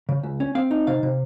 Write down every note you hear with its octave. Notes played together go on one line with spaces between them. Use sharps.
C#3
C#2
C#4
C4 F5
D#4
C3 F5
C3